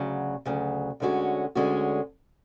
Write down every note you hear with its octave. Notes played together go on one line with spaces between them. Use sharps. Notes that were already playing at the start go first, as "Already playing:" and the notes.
Already playing: D2 C#3 F#3
D2 C#3 F#3
D2 D3 G#3 C#4 F#4
D2 D3 G#3 C#4 F#4